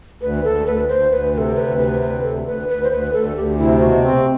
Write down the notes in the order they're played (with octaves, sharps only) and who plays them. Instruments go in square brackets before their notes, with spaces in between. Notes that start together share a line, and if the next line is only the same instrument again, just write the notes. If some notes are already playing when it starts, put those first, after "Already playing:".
[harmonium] D2 [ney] B4
[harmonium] D2 [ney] A4
[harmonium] D2 [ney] B4
[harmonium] D2 [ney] C5
[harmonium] D2 [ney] B4
[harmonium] C3 [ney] B4
[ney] A4
[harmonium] D2 [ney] B4
[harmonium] C3 [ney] B4
[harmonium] D2 [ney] B4
[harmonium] D2 [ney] A4
[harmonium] D2 [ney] B4
[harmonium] D2 [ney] B4
[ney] C5
[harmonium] D2 [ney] B4
[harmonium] D2 [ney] A4
[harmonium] D2 [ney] G4
[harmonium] C3 [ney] E4
[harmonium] B2 [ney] F#4
[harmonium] C4